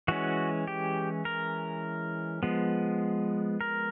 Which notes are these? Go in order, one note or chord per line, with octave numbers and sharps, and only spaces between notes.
E3 G#3 C#4 F#4
G4
A#4
F3 G#3 B3
A#4